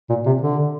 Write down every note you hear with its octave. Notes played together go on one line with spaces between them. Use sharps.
A#2
C3
D3